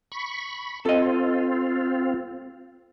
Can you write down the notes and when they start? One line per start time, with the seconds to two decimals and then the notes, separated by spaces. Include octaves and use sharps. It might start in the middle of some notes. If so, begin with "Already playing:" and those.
0.12 B5 C#6
0.85 C4 F4 A4 D#5